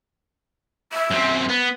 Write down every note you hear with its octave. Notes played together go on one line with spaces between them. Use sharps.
E5
F#2 C4
B3